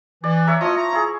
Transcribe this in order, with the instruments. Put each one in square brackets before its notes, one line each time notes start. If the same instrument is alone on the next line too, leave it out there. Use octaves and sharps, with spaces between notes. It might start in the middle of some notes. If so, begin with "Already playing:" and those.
[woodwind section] E3 [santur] D5
[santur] C#5 E5 A#5
[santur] F3 E4 [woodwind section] A3 C#5 D#5
[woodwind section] A#5
[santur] E4 G#4